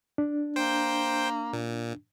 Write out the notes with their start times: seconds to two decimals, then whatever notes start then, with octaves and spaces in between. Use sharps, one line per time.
0.18 D4
0.56 A#3 C5 G5
1.53 A#2